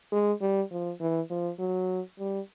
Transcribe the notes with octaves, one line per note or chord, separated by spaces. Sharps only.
G#3
G3
F3
E3
F3
F#3
G3